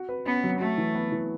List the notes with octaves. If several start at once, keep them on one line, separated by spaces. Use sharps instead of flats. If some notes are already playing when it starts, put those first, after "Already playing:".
Already playing: F#4
B4
B3 C#4
F#3
A3 F#4
E3
B3
E3